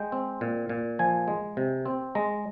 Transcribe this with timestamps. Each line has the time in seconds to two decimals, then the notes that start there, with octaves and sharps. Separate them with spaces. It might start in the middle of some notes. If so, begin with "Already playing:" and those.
Already playing: G#3 G5
0.12 C4
0.41 A#2
0.69 A#2
0.99 F3 G#5
1.28 G#3
1.57 C3
1.86 C4
2.15 G#3 A#5